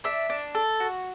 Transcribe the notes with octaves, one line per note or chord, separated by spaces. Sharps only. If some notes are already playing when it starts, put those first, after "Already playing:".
D4 E5
D4
A4
F#4